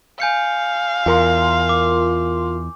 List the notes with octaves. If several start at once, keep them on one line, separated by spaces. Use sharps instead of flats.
F5 G#5 G6 C#7
E2 F4 A#4 C6
D6